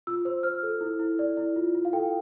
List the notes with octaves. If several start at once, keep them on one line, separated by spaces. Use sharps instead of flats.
F4 E6
C5 E6
C5 F6
A4
E4
E4
D5
E4
F4
F4
F5
A4 G5